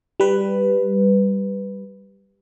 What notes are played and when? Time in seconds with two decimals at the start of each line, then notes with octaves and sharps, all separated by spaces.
0.20 G3 B4